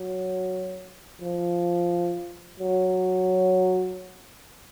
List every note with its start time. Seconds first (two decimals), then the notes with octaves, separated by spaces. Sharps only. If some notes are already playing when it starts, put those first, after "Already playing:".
Already playing: F#3
1.22 F3
2.60 F#3